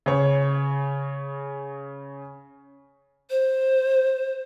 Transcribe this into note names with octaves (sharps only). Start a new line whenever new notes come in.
C#3 C#5
C5